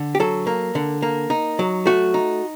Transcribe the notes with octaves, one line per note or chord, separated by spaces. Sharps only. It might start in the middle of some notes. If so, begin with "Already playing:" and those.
Already playing: D3
G4
F#3 A4
A#3
D3
A#3
D#4
F#3
A3 F#4
D#4